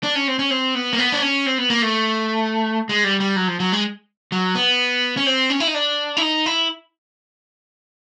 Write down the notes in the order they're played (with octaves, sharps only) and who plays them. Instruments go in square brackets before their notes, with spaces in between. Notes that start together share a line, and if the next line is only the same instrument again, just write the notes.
[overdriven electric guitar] D4
C#4
C4
C#4
C4
B3
A#3
B3
D4
C#4
C4
B3
A#3
A3
G#3
G3
G3
F#3
F3
F#3
G#3
F#3
B3
C#4
C4
C#4
E4
D#4
D4
E4
D#4
E4